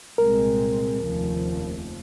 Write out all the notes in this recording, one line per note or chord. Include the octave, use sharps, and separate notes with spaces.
C2 A#2 G#3 C4 A#4
F1 D#2 C#3 F3